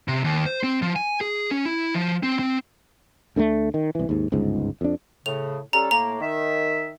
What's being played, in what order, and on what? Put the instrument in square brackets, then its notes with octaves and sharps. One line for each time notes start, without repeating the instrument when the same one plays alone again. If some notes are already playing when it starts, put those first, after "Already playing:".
[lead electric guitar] C3
D#2
C5
C4
F3
G#5
G#4
C#4
E4
F3
C4
C4
[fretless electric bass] D2 D3 D#3 A3
D#3
C2 E3
D#2 G#2
G1 C#2 G#2
F2 D4
[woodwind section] A2 C#3 [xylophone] F7
[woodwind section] G3 C#4 A4 [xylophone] A#5
[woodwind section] A2 A#3 [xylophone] A#5
[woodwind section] D#3 E5